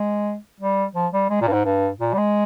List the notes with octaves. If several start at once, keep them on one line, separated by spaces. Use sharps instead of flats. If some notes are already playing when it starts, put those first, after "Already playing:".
Already playing: G#3
G3
F3
G3
G#3
A#2
G2
G#2
G2
A#2
G3
G#3